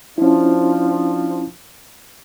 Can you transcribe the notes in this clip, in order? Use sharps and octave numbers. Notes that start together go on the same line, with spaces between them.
F3 C#4 D4 E4